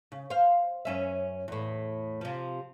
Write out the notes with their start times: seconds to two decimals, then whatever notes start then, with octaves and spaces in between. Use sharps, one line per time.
0.12 C#3
0.30 C5 F5
0.85 F#2 C#4 E5
1.48 E2 A2
2.21 C3 F3